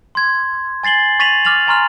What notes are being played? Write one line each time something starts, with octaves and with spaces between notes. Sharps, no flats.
C6 G#6
G#5 A6 C7 F#7 G7
C#6 A6 B6 D#7 F7 F#7
D6 F6 A6 F7 F#7
G#5 A#5 C6 C#6 F6 F7